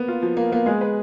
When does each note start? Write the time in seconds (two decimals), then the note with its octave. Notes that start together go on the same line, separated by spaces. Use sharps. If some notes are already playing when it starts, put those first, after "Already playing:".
Already playing: A#3 B3
0.08 F4
0.23 F3
0.37 F3 A#3
0.52 A#3 B3
0.66 G#3 G#4
0.81 B4